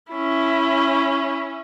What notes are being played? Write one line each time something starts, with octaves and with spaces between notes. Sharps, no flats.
C#4 E4